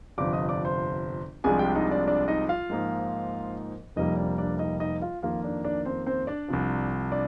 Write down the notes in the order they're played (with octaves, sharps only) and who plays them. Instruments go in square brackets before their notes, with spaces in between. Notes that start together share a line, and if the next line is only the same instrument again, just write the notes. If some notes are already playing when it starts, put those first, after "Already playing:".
[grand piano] G1 F2 C3 D5 D6
D#5 D#6
D5 D6
C5 C6
C2 C3 F3 G#3 D4 G#4 G#5
G4 G5
D#4 D#5
D4 D5
D4 D5
D#4 D#5
F4 F5
G#2 F3 A#3 D#4
F1 F2 C3 G3 A#3 D#4 D#5
D4 D5
D4 D5
D#4 D#5
D#4 D#5
F4 F5
F2 D#3 A#3 F4 F5
D4 D5
D4 D5
C4 C5
C4 C5
D4 D5
C2 C3 F3
D4 D5